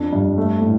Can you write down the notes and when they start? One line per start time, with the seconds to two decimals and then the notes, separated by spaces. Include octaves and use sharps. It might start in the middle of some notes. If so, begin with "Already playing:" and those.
Already playing: F2 D4
0.13 G2
0.38 A3
0.61 A2